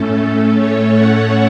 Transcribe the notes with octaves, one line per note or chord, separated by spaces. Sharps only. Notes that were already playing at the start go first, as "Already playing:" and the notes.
Already playing: A2 A3 C#4 A4
A4 C#5
C#5 F#5